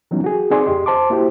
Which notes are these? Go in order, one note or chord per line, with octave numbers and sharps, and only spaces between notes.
E3 F#3 G3 B3 C#4 D#4
F#4 G#4
C4 D#4 G#4 D5 C6
F2 G4 D#5 C6
C5 A5 C6 D6
A#3 E4 F#4 G4 C5